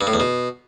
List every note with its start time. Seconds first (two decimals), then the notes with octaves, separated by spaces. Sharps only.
0.01 G2
0.07 A2
0.13 E2
0.20 B2